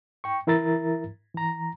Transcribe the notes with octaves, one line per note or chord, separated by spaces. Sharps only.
G5 C#6
E3 E4 A#4 E5 A#5 A6
E3 A#5